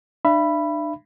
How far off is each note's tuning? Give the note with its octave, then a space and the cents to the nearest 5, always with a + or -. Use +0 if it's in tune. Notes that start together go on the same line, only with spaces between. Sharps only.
D4 +35 E5 +40 B5 +0